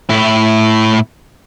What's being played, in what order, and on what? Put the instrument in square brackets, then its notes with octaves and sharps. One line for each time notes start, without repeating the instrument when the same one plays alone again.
[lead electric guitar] A2 E4